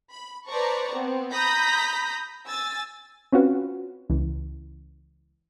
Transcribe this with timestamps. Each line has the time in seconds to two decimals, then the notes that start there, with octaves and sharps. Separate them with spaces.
0.11 B5
0.47 B4 C5 D5 A5 A#5 C#6
0.91 B3 C4
1.32 A#5 B5 D#6 G6 A#6 B6
2.47 G#5 E6 A6
3.32 C4 C#4 F4 F#4 B4
4.10 C#2 E3